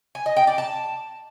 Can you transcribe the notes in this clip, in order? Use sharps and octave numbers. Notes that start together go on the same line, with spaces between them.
G#5
D#5
G5
D5
A5